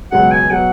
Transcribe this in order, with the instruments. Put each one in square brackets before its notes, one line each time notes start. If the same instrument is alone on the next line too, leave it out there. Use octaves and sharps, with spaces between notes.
[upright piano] C#2 B2 F#3 [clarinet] F#5
[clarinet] G#5
[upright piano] B2 F#3 [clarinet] F#5